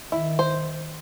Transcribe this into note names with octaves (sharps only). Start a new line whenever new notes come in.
D#3 E4
C5